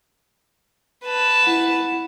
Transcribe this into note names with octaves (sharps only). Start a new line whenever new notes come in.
B4 A5
E4 F#5